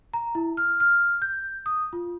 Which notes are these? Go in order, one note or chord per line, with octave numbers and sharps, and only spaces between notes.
A#5
E4
F6
F6
G6
D#6
F4